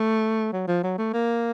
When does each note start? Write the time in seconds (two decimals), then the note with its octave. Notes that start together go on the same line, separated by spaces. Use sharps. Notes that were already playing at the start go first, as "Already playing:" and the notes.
Already playing: A3
0.52 F#3
0.67 F3
0.83 F#3
0.98 A3
1.13 A#3